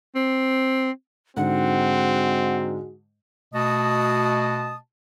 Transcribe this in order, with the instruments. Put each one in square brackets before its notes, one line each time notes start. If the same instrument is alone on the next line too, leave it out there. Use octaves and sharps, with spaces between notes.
[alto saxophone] C4
[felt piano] G#2 D3 [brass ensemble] G#3 D#4 F#4 [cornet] C4 [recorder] F#5
[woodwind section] B2 A3 F#4 D#5 A5 D#6